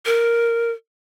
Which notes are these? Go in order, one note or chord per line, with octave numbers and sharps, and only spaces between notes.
A#4